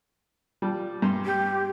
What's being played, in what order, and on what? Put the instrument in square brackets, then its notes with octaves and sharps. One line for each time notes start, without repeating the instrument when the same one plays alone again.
[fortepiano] F3 G3
G2 C6
[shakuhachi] G4